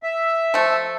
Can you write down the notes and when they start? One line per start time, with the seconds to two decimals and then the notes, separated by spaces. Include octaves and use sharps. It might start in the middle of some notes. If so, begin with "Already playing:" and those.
0.03 E5
0.54 F3 A3